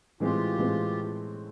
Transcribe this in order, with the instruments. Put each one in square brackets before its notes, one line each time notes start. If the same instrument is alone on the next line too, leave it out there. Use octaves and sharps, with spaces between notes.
[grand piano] A2 E3 G#3 C4 [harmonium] F4 G4
[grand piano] A2 E3 G#3 C4